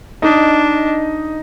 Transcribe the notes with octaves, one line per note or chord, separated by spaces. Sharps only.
D4 D#4 D#5